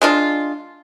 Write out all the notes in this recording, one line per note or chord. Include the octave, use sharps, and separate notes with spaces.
G#3 D4 F4